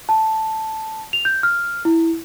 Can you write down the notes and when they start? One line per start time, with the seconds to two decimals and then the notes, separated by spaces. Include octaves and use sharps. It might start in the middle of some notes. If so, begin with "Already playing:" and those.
0.09 A5
1.13 F7
1.25 G6
1.43 F6
1.85 E4